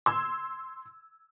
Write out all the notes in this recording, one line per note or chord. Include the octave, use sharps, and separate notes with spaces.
C6 E6 G#6